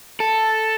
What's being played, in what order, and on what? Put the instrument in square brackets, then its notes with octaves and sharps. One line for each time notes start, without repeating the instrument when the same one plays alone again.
[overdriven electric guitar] A4